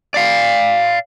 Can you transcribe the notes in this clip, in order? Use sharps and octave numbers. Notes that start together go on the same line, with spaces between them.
D5 F5